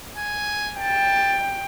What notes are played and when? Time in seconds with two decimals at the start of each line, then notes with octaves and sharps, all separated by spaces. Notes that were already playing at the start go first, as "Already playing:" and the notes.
0.17 G#5
0.81 G5 A5